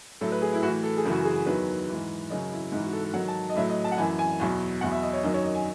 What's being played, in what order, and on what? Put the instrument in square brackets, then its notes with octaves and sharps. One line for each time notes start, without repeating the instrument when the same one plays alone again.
[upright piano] A2 F#3 A4
B4
G#4
E4
A2 F#4
E3
A4
G#4
F#2 C#3 E3
F#4
G#4
E2 D#3 F#3 B4
G#2 E3
F#2 C#3 F#3 D#5
E4
G#2 D#4
E3
F#4
A4
A4
G#2 D#3 F#3 F#5
A5
D#5
A2 F#3 E5
D#5
A5
F#5
F#2 E3 G#5
G#5
E2 B2 F#3
E2 B2 F#3 F#5
E5
D#5
C#5
F#2 D#3 F#3 D#5
C#5
D#5
G#5